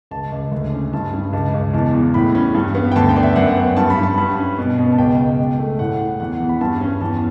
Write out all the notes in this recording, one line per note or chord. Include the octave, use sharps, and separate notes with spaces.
C#2 A5
C#2
D2
C#4
G2 A5
G2
C#2 A5
C#2
E2 A5
E2
A2 B5
C#4
G2
B3
G5
D2 A5
G5
B3 D5
E5
F#2 F#5
B3
G2 A5
B5
G2
A5
G2 B5
C#4
B2
B2
A5
C#2 G5
C#2
C#2
A3
A2 F#5
A2
E2 F#5
E2
B5
G2 A5
C#4
E2 A5